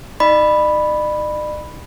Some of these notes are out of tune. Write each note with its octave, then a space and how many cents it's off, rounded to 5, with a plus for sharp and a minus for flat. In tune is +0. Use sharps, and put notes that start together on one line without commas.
D#4 +20 D5 +45 B5 +0